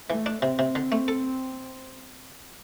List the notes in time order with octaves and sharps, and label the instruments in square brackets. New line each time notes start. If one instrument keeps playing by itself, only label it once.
[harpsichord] E3 [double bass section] A3
[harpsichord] D4
[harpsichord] C3 [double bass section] C4
[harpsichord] C3
D3
A3
A4